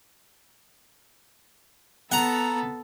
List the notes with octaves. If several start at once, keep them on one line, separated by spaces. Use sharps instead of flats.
B3 A4 F#5 A#5